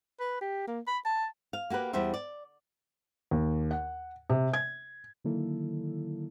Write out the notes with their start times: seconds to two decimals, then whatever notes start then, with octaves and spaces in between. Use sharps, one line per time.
0.20 B4
0.41 G4
0.67 A#3
0.87 B5
1.05 A5
1.53 F5
1.70 A#3 F#4 G4 B4
1.93 E2 G3 G4 C5 E5
2.14 D5
3.31 D#2
3.71 F#5
4.30 C3
4.54 G#6
5.24 D3 D#3 F#3 A#3 E4 A4